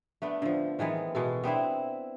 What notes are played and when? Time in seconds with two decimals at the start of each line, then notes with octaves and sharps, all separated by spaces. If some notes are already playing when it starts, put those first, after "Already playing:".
0.22 A3 B3 D4
0.42 D3 F3
0.79 D#3 E3 G#3 B3
1.15 B2 G#3 A4
1.43 B3 C4 D4 E4